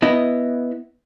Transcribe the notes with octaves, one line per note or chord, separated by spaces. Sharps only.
B3 E4 D#5